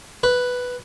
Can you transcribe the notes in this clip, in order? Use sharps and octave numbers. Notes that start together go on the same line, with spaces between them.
B4